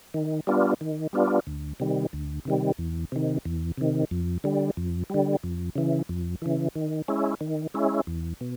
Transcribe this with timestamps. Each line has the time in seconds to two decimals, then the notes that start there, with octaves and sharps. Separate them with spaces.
0.14 D#3
0.47 G3 B3 D4 F4
0.81 D#3
1.13 G3 B3 D4 F4
1.47 D2
1.80 C3 D#3 G3
2.13 D2
2.45 C3 D#3 G3
2.78 E2
3.12 C3 D#3
3.45 E2
3.77 C3 D#3
4.11 F2
4.44 D3 G3
4.77 F2
5.10 D3 G3
5.43 F2
5.75 C#3 E3
6.09 F2
6.42 C#3 E3
6.75 D#3
7.08 G#3 C#4 E4
7.41 D#3
7.74 G#3 C#4 E4
8.07 E2
8.41 B2